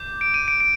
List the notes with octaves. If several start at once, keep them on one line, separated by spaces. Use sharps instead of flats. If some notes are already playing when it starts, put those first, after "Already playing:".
Already playing: D6 G6
D7
D#7
D7
D7